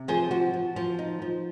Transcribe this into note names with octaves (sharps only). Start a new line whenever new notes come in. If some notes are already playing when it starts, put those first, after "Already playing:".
Already playing: C3
F3 G#4 C5
F3 F#4
F3
F3
D#4
F3